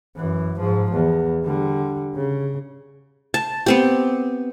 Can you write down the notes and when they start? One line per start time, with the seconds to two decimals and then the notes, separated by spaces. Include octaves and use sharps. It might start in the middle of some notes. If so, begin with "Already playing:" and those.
0.17 F#2 E3
0.59 G#2 F3
0.92 E2
1.45 D3 G3
2.15 C#3
3.34 A5
3.66 B3 C4 G4